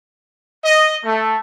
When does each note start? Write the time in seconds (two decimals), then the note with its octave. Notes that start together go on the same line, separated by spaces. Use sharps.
0.64 D#5
1.04 A3